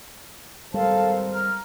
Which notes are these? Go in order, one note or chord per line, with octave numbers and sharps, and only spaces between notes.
G#1 G3 A4 A#4 C5 F5 A5
A#5 F6